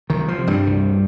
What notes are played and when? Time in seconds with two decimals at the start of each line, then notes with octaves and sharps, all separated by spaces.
0.10 C2 D#3
0.28 F3
0.38 C3
0.47 G2 G3
0.67 C2